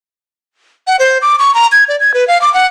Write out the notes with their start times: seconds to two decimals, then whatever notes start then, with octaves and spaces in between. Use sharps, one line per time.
0.87 F#5
0.99 C5
1.22 D6
1.39 C#6
1.54 A#5
1.72 G#6
1.89 D5
2.00 G#6
2.14 B4
2.28 F5
2.42 D6
2.54 F#5